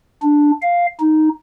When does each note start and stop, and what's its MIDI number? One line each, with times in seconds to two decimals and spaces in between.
0.23 0.51 62
0.62 0.86 77
1.00 1.29 63